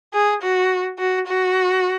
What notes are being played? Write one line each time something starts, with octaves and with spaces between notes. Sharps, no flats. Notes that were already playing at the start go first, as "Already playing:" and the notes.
G#4
F#4
F#4
F#4